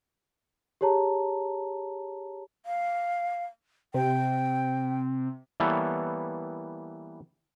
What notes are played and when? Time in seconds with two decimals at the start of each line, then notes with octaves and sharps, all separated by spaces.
0.81 G4 G#4 C#5 A5 A#5
2.66 F5
3.94 C3 G5
5.60 E3 G3 A#3 B3 A4 C#5